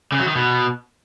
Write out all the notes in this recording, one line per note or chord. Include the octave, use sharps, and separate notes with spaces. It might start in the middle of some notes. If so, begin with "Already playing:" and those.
C#3
F#3
D#3
B2